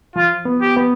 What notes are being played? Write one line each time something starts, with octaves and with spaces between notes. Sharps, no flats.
F3 F4
B3
G4
B3